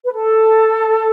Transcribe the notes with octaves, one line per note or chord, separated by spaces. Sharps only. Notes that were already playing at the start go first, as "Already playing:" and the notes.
B4
A4